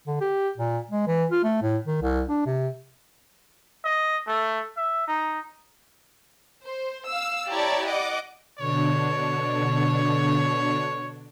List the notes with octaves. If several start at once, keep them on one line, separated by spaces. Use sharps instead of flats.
D3
G4
A#2
G#3
E3
F4
A3
A2
D#3
C2
D4
C3
D#5
A3
E5
D#4
C5
F5 E6
E4 G4 C#5 D5 A5 A#5
D5 D#5 F#5 D6
B2 D3 D4 C#5